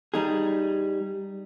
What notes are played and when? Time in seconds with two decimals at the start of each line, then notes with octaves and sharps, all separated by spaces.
0.14 G3 D#4 G#4